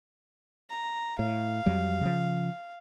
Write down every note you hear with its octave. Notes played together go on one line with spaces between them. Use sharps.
A#5
A2 F5
F2 F#3 G3
C#3 F3